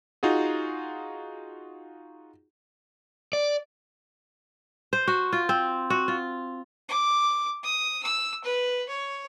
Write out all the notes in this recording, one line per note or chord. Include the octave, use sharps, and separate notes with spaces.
D#4 F4 F#4 G#4
D5
C5
F#4
F4
C4
F#4
F4
D6
D#6
E6
B4
C#5